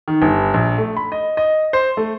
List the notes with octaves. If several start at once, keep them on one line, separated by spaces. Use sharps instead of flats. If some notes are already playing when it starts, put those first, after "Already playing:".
D#3
G1
A#1
A3
B5
D#5
D#5
C5
A3